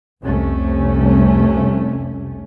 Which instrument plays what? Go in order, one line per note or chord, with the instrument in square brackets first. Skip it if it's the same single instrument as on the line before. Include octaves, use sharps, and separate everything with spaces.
[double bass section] F1 C2 C3 A3 C#4